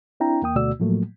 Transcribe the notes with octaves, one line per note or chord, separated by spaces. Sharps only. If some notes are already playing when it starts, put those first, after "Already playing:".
C4 D4 E4 G5 A#5
E2 A#3 G5 D#6
D2 B2 A3 F#4 D5 E6
A2 F3 F#3 A3 A#3